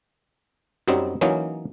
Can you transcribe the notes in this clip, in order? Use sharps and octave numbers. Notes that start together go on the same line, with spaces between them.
F#2 F#3 G3 C4 D#4
E3 F#3 A#3 C#4 D#4